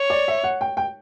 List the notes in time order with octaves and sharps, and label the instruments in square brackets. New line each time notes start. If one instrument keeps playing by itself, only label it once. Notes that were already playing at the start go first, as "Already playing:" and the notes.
Already playing: [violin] C#5
[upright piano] D5
E5
F#5
G5
G5